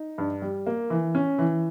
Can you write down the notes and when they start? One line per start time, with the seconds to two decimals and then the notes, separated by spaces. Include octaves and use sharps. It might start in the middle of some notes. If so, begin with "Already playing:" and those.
Already playing: D#4
0.18 G2
0.42 G3
0.66 A#3
0.90 E3
1.15 C#4
1.39 E3